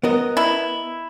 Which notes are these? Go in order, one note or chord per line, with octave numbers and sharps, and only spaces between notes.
B3 A#4 D#5
E4